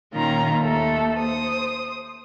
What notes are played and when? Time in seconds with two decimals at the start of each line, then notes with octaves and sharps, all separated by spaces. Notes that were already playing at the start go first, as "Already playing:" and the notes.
0.13 A#2 D#3 C#4 F4 A#5
0.61 D#2 A3 A4
1.19 C5 D#6